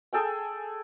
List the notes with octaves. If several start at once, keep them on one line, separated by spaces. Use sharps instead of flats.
G#4 A4 G5 G#5